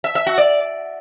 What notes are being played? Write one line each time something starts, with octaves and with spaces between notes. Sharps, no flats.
E5
E5
F#4
D5